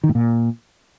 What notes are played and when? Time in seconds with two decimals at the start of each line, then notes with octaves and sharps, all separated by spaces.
0.04 D#3
0.09 A2
0.15 A#2